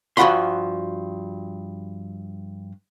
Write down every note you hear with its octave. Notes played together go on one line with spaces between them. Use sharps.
G2 F3 F#4 F#5 B5 C6